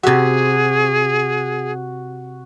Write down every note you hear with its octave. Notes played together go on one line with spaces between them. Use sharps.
C3 F#4 G#4 E5